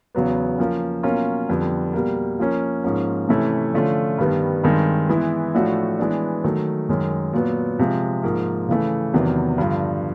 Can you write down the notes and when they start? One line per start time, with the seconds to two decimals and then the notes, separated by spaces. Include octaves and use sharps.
0.15 E2 C#3 F#3 B3
0.58 F3 A#3 C#4
1.03 B2 F#3 A#3 C#4 F4
1.49 F2 D3 G3 B3
1.93 B2 G3 A#3
2.39 F3 A#3 C#4
2.84 G#2 F3 A#3 C#4
3.29 C3 E3 A3 C#4 E4
3.74 D3 F3 A3 C#4 F4
4.18 G2 D#3 G3 B3
4.64 G2 D#3 G#3 C4
5.09 E3 G#3 B3 E4
5.54 A2 F3 A3 D4 F#4
5.99 E3 G#3 B3 D4
6.44 D#3 F#3 A3
6.89 F#2 D#3 G#3
7.33 A#2 F#3 B3
7.79 C3 F3 G#3
8.23 G#2 F3 A#3
8.68 C#3 E3 A3
9.13 E2 C3 D#3 F#3 B3
9.58 G2 D3 F3